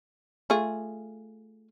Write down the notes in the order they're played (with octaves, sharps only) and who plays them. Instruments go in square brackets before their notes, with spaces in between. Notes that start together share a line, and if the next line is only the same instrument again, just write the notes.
[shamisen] A3 F4 G#4